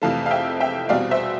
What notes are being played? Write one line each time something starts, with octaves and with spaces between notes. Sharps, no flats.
F2 C3 E3 A3 F5 A5
F5
E5 G5
E5 G5
E2 B2 G3 C4 D5 F5
C5 E5